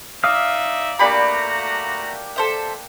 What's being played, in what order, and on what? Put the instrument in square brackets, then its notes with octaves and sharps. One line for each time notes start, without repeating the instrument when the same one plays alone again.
[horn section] D#4 D5 E5 [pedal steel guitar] F5 D#6 F6
[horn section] A3 F#4 A#5 [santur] A#3 D4 G4 [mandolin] D5 B5
[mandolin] A4 C5 E5